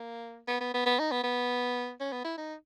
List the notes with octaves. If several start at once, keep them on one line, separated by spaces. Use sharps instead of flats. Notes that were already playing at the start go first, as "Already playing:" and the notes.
Already playing: A#3
B3
B3
B3
B3
D#4
B3
B3
C#4
B3
E4
D#4